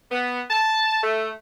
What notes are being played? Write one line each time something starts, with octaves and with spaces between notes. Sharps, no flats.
B3
A5
A3